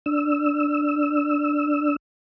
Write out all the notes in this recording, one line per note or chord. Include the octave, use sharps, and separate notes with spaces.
D4 E6